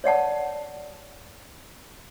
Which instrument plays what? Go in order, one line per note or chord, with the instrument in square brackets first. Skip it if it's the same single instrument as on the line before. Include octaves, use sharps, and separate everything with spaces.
[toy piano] C#5 D5 F#5 A5